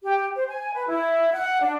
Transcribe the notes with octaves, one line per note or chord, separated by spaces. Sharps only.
G4
C5
G#5
B4
E4
F#5
D4